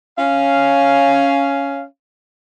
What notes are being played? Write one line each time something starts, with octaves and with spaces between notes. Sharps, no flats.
C#4 F5